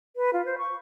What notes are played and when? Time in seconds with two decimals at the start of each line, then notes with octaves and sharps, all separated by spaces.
0.16 B4
0.33 F4
0.46 C5
0.58 C#6